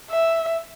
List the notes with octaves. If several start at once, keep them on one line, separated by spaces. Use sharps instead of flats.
E5